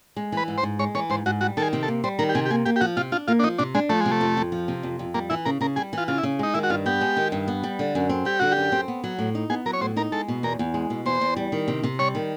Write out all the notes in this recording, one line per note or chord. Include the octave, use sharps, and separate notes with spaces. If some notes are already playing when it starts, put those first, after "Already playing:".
G#3
E3 B4
G#2
C5
G#2
G#3 C#5
E3 C#5
G#2 C5
G#2 F#4
G3 F#4
D#3 A4
G#4
C3
A4
A#3
G3 C5
D#3 A#4
G4
C3 G#4
G4
A#3 G#4
A#3 G4
G4
F3 F#4
C3 F4
D4 F4
A#3 F4
D4
F3 D#4
C3 D4
G#3 D4
F3 A3
G#3
C3
A3
F2
F2
F3
C3
F2
F2
G3 A#3
E3 E4
C#3 A#4
C#3 A#4
G3 G#4
E3 F4
C#3 F4
E4
C#3
G#3 D#4
D#3 E4
F#4
G2 F4
B3 G4
G#3
D#3
G2
B3
G3
D3
F#2
C4
G3 G4
D3 F#4
G4
F#2
C4
B3
F#3
A2
D#4
B3 G#4
F#3 A#4
C#5
A2 C5
D#4 A#4
G#3 A4
B2
E2 A#4
E2
G#3
B2
E2 C5
E2
G3
D#3
C3
C3
G3 C#5
D#3